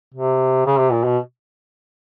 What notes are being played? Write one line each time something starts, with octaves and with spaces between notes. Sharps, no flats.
C3
C#3
C3
A#2
B2